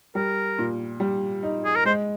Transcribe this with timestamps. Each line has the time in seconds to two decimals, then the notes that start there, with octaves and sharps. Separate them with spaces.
0.15 G3 A#4
0.58 A#2
1.00 G3
1.43 D#4
1.65 G#4
1.76 A#4
1.85 G#3 C5